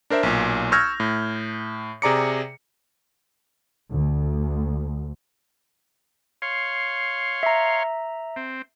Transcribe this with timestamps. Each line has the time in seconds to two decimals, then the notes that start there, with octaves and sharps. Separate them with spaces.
0.10 D4 A#4 C5 E5
0.23 B1 A#2
0.72 C#6 E6 F6 G6 G#6 A#6
1.00 A2
2.02 C3 G#4 D5 A#5 D6 C#7
3.91 D2
6.42 C#5 F5 C6
7.43 E5 A#5
8.36 C4